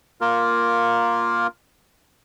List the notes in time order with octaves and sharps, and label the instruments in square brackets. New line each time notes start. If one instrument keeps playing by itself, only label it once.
[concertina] A#3 F4 A#4